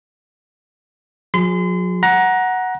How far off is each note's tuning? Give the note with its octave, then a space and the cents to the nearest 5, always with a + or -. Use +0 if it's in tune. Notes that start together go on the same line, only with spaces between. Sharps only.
F#3 -45 G#4 +0 C6 -35
F#5 +0 A#5 +20